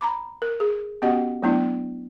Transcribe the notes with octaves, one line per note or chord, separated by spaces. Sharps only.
A#5 B5 D6
A#4
G#4
B3 C#4 F#4 G4 D#5 F#5
F#3 A3 B3 D4 E4